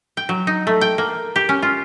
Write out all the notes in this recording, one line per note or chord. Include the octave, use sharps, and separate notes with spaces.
G5
F#3
D#4
A3
G5
A#3
G4
C#4
F4